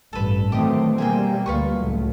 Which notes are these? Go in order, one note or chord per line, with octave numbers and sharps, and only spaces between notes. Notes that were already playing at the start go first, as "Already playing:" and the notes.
A1 G2 A4 B4
D#3 E3 F#3 A3 C4 G4 D#5
B2 G3 A#3 G#4 E5 G5
D2 F4 B4 C#6
C#2 A2 F#3 A3